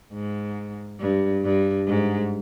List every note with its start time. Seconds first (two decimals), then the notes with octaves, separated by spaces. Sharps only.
0.12 G#2
1.00 G2
1.44 G2
1.87 G#2